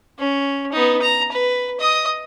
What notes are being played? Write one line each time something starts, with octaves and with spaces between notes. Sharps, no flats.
C#4
B3 D#4
A#5
B4
D#5 D#6